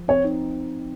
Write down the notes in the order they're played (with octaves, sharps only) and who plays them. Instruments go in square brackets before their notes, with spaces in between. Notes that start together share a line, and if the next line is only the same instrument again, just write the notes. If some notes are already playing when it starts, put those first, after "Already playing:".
Already playing: [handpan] F3
[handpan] C4 [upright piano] C#5
[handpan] D#4